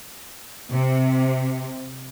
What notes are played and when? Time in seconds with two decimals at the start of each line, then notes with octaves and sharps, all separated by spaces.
0.71 C3